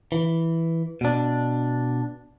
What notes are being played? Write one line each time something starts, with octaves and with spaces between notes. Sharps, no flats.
E3
B2 D4